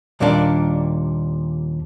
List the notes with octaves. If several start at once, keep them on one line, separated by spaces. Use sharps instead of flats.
D#2 A#2 G3 A#3 D4